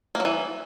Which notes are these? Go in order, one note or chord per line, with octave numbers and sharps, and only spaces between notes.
A#3
F#3
E3